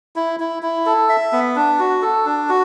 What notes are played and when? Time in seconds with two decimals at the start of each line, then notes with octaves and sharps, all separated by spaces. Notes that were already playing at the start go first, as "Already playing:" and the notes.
0.16 E4
0.40 E4
0.63 E4
0.86 A4
1.09 E5
1.32 B3
1.56 D4
1.79 F#4
2.02 A4
2.26 D4
2.49 F#4